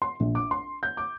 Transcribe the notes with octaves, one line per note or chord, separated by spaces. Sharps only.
C6
A#1
D6
C6
G6
D6